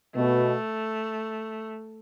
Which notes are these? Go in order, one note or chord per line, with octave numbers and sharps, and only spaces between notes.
B2 A3